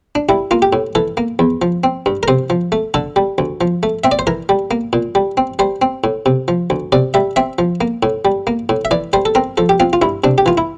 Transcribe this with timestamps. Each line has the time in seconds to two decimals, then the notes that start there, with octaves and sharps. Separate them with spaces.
0.15 D4
0.29 G3 E4
0.51 A#3 F4
0.62 G4
0.73 A2
0.95 E3 A4
1.17 A#3
1.39 E2
1.62 F3
1.84 C4
2.06 G2
2.23 A#4
2.28 C3 C5
2.50 F3
2.72 A3
2.94 D3 A4
3.16 G3
3.38 D2
3.61 F3
3.83 A3
4.04 C4 E5
4.12 D5
4.19 C5
4.27 E3 A#4
4.49 G3
4.71 A#3
4.93 A#2
5.15 G3
5.37 C4
5.59 G3 C5
5.82 C4
6.04 A2
6.26 C3
6.48 F3
6.70 D2
6.92 C3 D5
7.14 G3 E5
7.36 C4 E5
7.59 F3
7.81 A#3
8.03 A2
8.25 G3
8.47 A#3
8.69 A2
8.85 E5
8.91 E3 D5
9.13 G3 C5
9.25 A4
9.35 C4 A#4
9.57 F3 A4
9.69 G4
9.80 C4 F4
9.93 F4
10.02 G2 E4
10.24 C3 D4
10.38 G4
10.46 E3 F4
10.57 E4